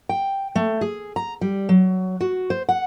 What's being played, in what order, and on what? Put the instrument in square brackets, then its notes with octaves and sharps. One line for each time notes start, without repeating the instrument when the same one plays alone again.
[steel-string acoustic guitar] G5
A3
G#4
A#5
G3
F#3
F#4
C5
F#5